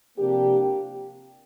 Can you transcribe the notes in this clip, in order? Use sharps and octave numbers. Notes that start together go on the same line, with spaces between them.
C3 F3 A#3 D4 G4